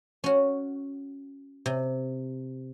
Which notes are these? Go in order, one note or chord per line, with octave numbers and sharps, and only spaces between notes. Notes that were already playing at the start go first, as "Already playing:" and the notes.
C#4 F#4
C3